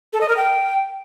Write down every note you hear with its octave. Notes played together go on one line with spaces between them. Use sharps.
A4
D#5
A#4
G5